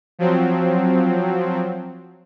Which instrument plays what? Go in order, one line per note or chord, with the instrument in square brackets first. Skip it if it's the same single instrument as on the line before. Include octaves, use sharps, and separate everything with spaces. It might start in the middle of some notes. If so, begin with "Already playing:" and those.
[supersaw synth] F3 F#3 C4